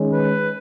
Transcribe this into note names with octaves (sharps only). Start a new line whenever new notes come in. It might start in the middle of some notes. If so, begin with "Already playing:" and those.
Already playing: D#3 G#3 C#4
B4